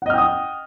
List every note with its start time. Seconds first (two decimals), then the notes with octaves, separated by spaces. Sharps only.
0.02 F#5
0.06 D#5
0.10 F6
0.14 G5
0.18 D#6